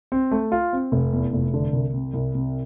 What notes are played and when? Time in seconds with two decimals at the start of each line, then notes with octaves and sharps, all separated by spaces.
0.12 C4
0.31 A3
0.52 F4
0.73 C4
0.92 F1
1.13 E2
1.33 F1
1.54 D3
1.73 C2
1.94 C3
2.14 C2
2.35 C3